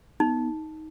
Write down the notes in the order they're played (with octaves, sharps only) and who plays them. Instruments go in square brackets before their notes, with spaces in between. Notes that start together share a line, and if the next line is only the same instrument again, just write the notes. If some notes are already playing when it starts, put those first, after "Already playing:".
[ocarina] B3 [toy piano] D#4